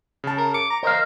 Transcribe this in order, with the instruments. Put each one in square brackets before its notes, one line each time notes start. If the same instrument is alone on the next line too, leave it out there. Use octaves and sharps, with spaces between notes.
[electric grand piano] C#3 A5
[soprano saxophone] A#4
[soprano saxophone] D6 [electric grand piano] C#7
[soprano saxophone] A#5
[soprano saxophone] A#4 [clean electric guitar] C5 D#5 F5